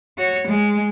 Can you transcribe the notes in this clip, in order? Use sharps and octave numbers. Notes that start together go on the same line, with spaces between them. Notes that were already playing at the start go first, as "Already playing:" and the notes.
F#4 C#5
G#3